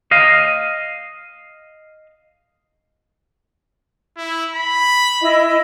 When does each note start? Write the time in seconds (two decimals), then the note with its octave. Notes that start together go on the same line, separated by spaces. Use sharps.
0.11 D#5 F5
4.17 E4
4.56 B5
5.21 E4 D#5